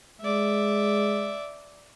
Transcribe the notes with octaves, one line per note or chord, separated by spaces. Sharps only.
G#3 D5 E5